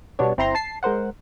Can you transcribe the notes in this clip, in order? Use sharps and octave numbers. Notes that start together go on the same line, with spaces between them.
B2 G3 B3 D4 C#5
G1 C4 E4 A#5 C6
A5 C7
G#3 A#4 C5 F#5